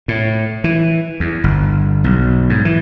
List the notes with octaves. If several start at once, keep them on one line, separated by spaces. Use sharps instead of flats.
A2
E3
E2
G1
B1
G#2
E3